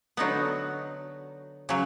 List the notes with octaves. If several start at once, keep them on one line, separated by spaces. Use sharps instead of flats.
D3 F#3 B3 D#4 F#4
C#3 F#3